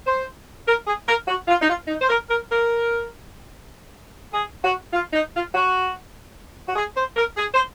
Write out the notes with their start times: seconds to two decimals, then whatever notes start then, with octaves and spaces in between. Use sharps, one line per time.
0.05 C5
0.66 A#4
0.86 G#4
1.06 A#4
1.27 F#4
1.48 F4
1.59 D#4
1.68 F4
1.87 D#4
2.00 C5
2.08 A#4
2.28 A#4
2.49 A#4
4.32 G#4
4.63 F#4
4.93 F4
5.13 D#4
5.34 F4
5.54 F#4
6.67 F#4
6.76 G#4
6.96 C5
7.16 A#4
7.37 G#4
7.52 C5